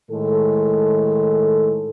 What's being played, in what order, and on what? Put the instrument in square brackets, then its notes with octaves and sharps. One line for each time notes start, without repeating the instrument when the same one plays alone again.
[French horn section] A2 D#3 G#3 A4